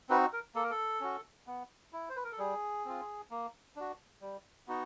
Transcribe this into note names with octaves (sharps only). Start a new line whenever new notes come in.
C4 D#4 F#4 B4
A#4
A#3 A4
A#4
A4
C#4 F#4
B3
E4
C5
B4
A#4
A4
G3 G#4
C4 F4
A#3
D4 F#4
G3
B3 D#4 F#4